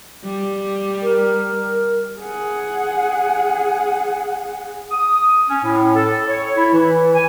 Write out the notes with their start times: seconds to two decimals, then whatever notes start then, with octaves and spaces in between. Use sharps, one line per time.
0.24 G3
1.02 A#4
2.19 G#4 F#5
4.91 D#6
5.49 C#4
5.63 A2
5.95 A4
6.28 C#5
6.56 E4
6.73 E3
7.14 G#5